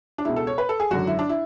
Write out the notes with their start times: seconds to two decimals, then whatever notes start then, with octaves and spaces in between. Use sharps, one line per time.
0.18 D4
0.25 C#2 B2 E4
0.36 A4
0.47 C#5
0.58 B4
0.69 A4
0.80 G#4
0.91 G#1 F#2 D3 F#4
1.07 E4
1.19 D4
1.29 E4